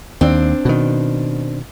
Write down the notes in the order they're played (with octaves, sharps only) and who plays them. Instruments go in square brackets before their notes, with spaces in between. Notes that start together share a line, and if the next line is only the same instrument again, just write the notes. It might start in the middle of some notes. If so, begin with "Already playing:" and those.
[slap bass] D#2 [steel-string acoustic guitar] C4 D4
[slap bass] B2 D#3